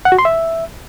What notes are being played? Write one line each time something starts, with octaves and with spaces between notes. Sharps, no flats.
F#5
F#4
C6
E5